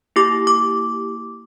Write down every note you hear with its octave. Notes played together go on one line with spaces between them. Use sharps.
A#3 E4 G4 D6
D6